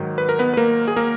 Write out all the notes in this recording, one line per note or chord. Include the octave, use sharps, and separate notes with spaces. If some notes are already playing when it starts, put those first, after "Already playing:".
Already playing: G#2 D#3 F#3
B4
A#4
B3 B4
B4
A#3 A#4
G#4
A#3 A#4